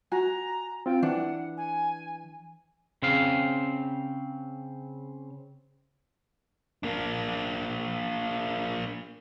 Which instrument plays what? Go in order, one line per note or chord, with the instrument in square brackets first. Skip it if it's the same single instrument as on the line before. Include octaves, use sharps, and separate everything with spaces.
[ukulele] F#4 [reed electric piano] G#5 [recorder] A#5
[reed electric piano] C4 F4 [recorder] G5
[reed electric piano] E3 [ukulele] D4 [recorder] F#5
[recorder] G#5
[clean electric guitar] C#3 C4 F5
[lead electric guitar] A#3 D4